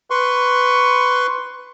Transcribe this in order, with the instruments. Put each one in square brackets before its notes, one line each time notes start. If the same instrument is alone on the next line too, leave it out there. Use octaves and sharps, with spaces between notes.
[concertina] B4 C6 C#6